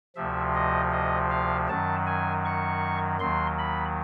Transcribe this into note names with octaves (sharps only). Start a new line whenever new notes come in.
D2 C3 F3 E5
D#5
D#5
F5
F#2 D#3 F#3 A5
G#5
C#6
D#2 D#3 F#3 C6
B5